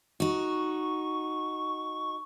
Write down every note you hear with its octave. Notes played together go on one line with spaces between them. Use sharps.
D#4 F#4 C#6